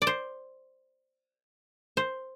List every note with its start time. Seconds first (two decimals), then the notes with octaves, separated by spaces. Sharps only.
0.02 D5
0.07 C5
1.97 C5